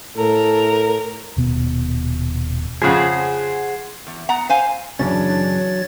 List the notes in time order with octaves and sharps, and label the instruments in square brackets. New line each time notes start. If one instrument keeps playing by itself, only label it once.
[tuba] A2 [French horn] A4 [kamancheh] A#4
[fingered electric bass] D#1 B2 B3
[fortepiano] F2 C#3 F3 [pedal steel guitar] G#4 C5 F#5
[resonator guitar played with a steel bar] E2
B3 F#5 A#5
C5 F5 G#5
[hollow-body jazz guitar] F#2 C#3 C#4 [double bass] E3 D4 [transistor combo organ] F#3 [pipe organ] C#5 A6